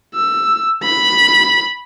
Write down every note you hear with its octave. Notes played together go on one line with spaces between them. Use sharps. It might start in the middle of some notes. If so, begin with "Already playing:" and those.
E6
B5